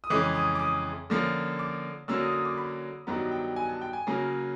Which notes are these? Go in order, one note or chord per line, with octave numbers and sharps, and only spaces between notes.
D#6
F2 C#3 E3 G#3 C#4 D6
D#6
D6
D#6
D3 F3 A#3 C#4
D6
D3 F#3 A#3 C#4 E6
D#6
D#6
D6
B5
G2 D#3 F#3 B3 A#5
G5
G#5
A5
G5
G#5
C#3 F#3 A#3 C#4